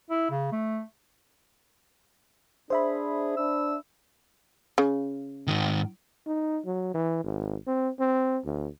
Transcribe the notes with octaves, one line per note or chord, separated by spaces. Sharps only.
E4
C#3
A3
D4 G#4 C5 E5 B5
D4 E6
C#3
G#2 D#3
D#4
F#3
E3
G#1
C4
C4
D2